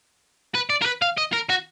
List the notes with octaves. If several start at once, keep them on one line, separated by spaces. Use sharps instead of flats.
B4
D5
A#4
B4
F5
D#5
A#4
F#4